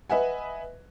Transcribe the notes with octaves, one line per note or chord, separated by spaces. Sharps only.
B4 D#5 E5 F#5 G#5